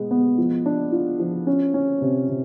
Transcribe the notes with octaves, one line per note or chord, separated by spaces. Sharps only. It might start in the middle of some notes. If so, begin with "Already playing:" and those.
Already playing: B2 G#3 B3
B3
F3
D4
F4
F3
C#4
C#4
C3
C3